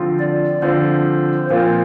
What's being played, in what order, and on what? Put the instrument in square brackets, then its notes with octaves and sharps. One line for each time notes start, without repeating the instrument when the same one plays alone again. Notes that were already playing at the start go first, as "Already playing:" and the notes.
Already playing: [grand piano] D3 F3 C4 F4
[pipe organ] D5
[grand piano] D3 F3 C4 F4 [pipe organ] C5
[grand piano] A#2 F3 C4 F4 [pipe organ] C5